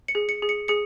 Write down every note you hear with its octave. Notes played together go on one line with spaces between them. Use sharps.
C#7
G#4
C#7
G#4
C#7
G#4 C#7